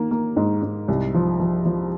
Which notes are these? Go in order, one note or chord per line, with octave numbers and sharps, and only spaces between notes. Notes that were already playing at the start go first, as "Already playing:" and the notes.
Already playing: D#3 A#3
A#3
G#2
G#2
C2
F3
F3
F3